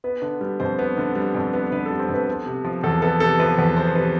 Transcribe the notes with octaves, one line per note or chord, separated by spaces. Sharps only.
B3 B4
D3
G3
F2 C5
B3
D3
G3
F2
B3
D3 B4
G3 A4
C4
F2
B4
B3 A4
C3
F3
E2 A4
B3 A4
C3 A4
F3 B4
E2 B4
B3 C5
C3 B4